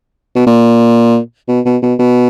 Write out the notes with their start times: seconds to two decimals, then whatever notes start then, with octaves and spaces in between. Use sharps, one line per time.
0.35 B2
0.47 A#2
1.48 B2
1.65 B2
1.82 B2
1.99 B2